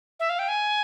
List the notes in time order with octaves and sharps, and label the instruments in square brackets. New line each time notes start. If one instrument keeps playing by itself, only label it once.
[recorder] E5
F5
G5
G#5